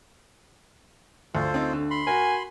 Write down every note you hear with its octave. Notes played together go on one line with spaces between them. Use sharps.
D2 F4 A4 C5
C4 D#4
D3
B5 C6
F#4 A#4 G#5